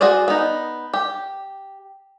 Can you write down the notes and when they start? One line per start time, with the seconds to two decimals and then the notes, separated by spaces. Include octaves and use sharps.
0.01 F#4 G#4 C5 D5
0.28 B3 D#4
0.94 G4